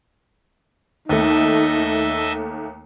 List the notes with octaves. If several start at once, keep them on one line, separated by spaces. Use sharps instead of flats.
D#2 A3 D#4 A4 D#5 E5